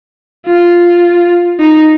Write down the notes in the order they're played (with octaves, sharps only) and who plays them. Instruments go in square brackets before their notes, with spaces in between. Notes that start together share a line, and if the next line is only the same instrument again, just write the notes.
[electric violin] F4
D#4